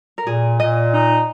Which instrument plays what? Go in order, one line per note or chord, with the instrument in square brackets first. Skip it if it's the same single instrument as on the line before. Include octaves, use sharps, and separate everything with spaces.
[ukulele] A#4
[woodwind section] A#2 [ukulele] G#4
[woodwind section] A#2 [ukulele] D#5
[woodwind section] D#4